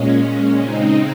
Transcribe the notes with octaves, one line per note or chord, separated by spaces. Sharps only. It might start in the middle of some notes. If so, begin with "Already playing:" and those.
Already playing: A#2 G#3 C#4
C#3 G#3 C4 D#4